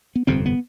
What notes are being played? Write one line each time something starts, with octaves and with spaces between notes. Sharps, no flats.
B3
G1 F2 C3 C4
B3